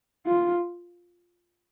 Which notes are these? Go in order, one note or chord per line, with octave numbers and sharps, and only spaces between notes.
F4